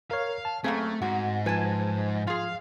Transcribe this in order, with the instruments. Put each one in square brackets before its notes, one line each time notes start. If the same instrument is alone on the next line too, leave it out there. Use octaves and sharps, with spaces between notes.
[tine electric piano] A#4 C#5 [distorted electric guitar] F5
[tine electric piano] A5
[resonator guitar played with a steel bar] F#2 A#3 G#4 [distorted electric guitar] A3 [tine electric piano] C4
[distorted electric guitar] G#2 [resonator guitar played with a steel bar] F#4
[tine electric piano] F3 G#5 G#6 [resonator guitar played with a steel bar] B4 A5
[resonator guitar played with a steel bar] F4 G#4 [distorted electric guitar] F5